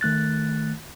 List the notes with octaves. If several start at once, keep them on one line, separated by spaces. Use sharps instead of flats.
D#3 A3 F#6 A6